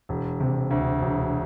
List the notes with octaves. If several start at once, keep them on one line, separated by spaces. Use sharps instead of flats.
E1
C3
D2
E1